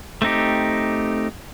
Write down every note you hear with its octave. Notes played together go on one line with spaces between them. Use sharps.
A3 C4 D#4 G4